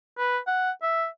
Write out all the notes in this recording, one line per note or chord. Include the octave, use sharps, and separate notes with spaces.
B4
F#5
E5